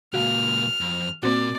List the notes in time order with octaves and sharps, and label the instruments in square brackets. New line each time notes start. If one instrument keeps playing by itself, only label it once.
[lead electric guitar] C#2 A#2 [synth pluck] F#4 F5 [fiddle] F6
[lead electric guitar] F2
[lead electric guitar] A#2 [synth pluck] A#3 C4 F#4 [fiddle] D5